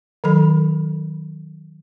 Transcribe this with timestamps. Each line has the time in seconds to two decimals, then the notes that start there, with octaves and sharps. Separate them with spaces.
0.24 D#3 F#3 A4 B5